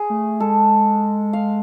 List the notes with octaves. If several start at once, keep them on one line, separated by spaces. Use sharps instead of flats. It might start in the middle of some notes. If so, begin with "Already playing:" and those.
Already playing: G#4
A3
G#3 A4
F5